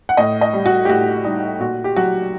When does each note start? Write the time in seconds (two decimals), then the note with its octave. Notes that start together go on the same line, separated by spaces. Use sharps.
0.09 F#5
0.17 A2 D#5
0.41 D#5
0.53 G3
0.66 F#4
0.85 G4
0.89 A2 F#4
1.25 G3 D#4
1.60 A#2 F#4
1.84 G4
1.96 F#3 F#4